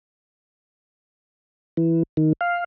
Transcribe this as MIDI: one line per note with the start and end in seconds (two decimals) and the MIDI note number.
1.77 2.03 52
2.17 2.33 51
2.41 2.64 77